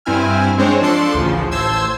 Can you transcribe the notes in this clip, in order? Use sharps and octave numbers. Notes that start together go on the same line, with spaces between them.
G2 C4 E4 G#5 F6
G#3 C4 D4 C5 C#5
F3 D4 A4 D5 C6 C#7
A1 D2 C#3 F3
A1 C5 A5 C6 E6 G#6